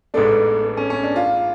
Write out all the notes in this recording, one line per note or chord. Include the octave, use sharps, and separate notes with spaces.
A1 G#2 G#3 A3 B3 D4
A3
C#4
C#4
D4
F4